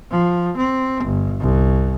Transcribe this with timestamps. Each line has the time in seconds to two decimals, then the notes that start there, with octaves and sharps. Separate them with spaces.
0.11 F3
0.57 C4
1.04 G1
1.40 C2